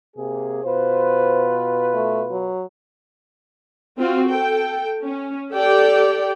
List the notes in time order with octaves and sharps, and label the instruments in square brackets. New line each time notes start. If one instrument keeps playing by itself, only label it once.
[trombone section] C3 A#3 G#4
[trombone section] B2 F4 B4 [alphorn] C5
[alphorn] A3
F#3
[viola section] C4 F4 F#4
A4 G5
C#4
G4 A4 D5 G5